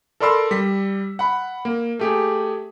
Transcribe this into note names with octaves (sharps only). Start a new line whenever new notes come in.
A4 A#4 D5 B5 C6 E6
G3 B6
F#5 B5
A#3
A3 G4 G#4